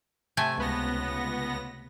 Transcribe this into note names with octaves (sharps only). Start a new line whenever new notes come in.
C3 A3 G#5
C#2 B3 A#6